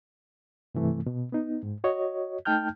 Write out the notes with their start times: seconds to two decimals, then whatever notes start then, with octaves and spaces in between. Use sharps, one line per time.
0.75 G2 C3 E3 A3
1.06 B2
1.32 B3 D#4
1.63 G#2
1.84 F#4 C#5 D#5
2.45 A3 D#4 G5 A5 F6 G6